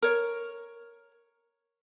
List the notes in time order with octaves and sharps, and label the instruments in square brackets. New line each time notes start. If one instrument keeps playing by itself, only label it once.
[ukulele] A#4 C#5